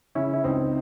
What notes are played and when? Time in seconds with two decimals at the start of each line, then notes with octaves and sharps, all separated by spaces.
0.15 C#3 C#4 E4
0.33 E4
0.44 C#2 C4 D#4